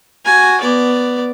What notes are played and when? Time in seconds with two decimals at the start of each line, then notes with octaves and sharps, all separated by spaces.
0.25 F#4 G#5
0.61 B3 D5